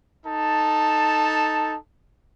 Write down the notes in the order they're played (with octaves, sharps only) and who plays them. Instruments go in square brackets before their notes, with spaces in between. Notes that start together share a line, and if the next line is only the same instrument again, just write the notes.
[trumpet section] D#4 A4 A5